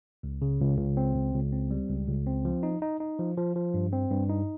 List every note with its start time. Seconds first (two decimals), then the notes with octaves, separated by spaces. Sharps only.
0.23 C#2
0.42 C#3
0.60 C#2
0.79 C#2
0.97 C4
1.16 C#2
1.34 C#2
1.53 C4
1.71 G3
1.89 C#2
2.08 C#2
2.27 C4
2.45 F3
2.63 D#4
2.82 D#4
3.00 D#4
3.19 F3
3.37 F3
3.56 F3
3.74 G2
3.93 C4
4.11 G2
4.29 D#4